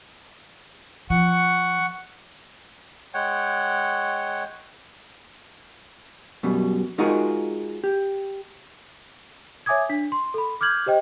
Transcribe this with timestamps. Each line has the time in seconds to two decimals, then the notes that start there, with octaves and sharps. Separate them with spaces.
1.10 F3 F#5 C#6
3.14 G#3 C#5 F#5 G5
6.43 F#2 B2 G3
6.98 G#3 D#4 F4 F#4 G#4 A#4
7.84 G4
9.66 C#5 E5 G#5 D6 D#6 G#6
9.89 D4 B6
10.12 C6
10.34 A4 B5
10.61 D6 F6 G6 G#6 F#7
10.86 G4 C5 D#5 G5